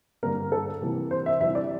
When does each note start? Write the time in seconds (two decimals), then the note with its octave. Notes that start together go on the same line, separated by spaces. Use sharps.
0.23 G2 D3 G3 A#3 A#4
0.52 A4
0.82 C3 E3 A#3
1.11 C5
1.26 E5
1.41 C3 E3 G3 C4 E5
1.55 D5